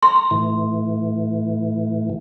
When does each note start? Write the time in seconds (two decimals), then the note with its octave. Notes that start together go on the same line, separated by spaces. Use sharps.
0.03 A#5 C6
0.31 A2 E3